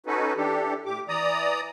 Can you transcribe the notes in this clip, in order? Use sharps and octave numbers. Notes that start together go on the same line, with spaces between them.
C#4 D#4 F#4 A4 B4
E3 D4 G4 A4
A2 G4 D6
E3 D5 A#5 D#6